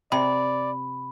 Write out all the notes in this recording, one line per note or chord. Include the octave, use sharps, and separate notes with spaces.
C3 D5 B5